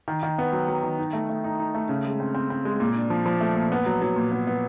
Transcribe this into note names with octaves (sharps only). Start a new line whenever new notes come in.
D#3
D#3
B3
F#3
F#3
D#3
D#4
A3
A3
D#4
D#4
A3
C#3
G#3
C4
C4
C4
G#3
A#2
D4
F3
F3
A3
A#2
B3
F#3
F#3
A#2
B3
B3